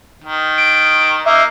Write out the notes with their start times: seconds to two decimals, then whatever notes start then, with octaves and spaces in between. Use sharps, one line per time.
0.24 D#3
0.58 D7
1.26 A#3 D#4 E5